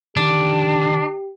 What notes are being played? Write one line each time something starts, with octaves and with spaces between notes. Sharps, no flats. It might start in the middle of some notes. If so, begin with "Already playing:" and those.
D3 D#3 D4 G4